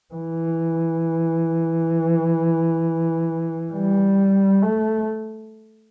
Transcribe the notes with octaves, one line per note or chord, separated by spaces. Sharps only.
E3
G3
A3